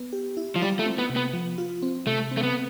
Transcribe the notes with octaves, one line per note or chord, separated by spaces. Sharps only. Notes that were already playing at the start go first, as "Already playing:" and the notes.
Already playing: B3
G4
E4
F3
G3 F4
A3
C4
B3
C3
B3
F3
F4
C4
C3 A3
C4
A3
B3